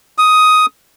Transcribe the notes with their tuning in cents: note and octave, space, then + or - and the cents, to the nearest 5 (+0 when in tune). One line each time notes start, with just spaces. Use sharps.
D#6 +10